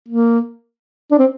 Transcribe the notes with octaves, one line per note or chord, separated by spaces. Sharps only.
A#3
D4
C4